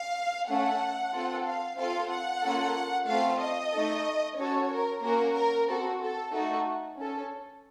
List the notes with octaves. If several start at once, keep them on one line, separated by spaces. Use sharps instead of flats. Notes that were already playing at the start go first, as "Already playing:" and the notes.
Already playing: F5
A3 C#4 A4 F#5
C4 F4 A4
F5
C4 F4 A4 F5
F#5
A#3 C#4 F4 A4
A3 C4 F4 A4 F5
D#5
A3 D#4 A4
C#4 F#4 A4 C#5
A#4
A#3 C#4 F#4 A#4
A#4
C4 F#4 A4
A4
A3 D#4 F#4 A4
C#4 A4